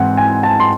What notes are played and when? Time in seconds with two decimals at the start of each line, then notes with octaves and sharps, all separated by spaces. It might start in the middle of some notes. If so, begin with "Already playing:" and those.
Already playing: G#2 E3 C4 F#5
0.17 G#5
0.43 A5
0.60 C6